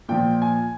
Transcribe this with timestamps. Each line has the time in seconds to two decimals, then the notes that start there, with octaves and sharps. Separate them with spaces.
0.09 A#2 F3 G5
0.42 G#5